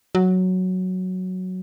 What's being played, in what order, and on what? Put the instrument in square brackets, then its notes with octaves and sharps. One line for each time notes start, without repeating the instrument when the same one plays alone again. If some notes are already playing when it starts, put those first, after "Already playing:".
[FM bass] F#3